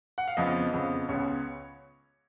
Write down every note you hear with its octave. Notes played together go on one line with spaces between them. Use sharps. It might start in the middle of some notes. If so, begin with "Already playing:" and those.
F#5
F5
F2 C#3 F3 B3 D#5
F2 C#3 F3 B3
C#2 C#3 G#3 B3 C#5